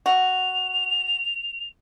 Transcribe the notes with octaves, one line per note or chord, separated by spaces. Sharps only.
F#4 F7